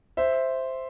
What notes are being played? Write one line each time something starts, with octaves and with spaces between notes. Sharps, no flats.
C5 E5